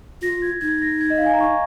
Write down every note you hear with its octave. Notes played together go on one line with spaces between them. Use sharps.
F4 A#6
G#6
D#4 G#6
A#6
G#6
D#5
F5
G#5
A#5
C#6